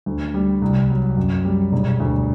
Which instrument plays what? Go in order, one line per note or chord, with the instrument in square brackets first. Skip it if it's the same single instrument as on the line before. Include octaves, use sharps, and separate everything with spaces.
[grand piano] D2
G3
C2
F#3
F#2
G3
E1
D2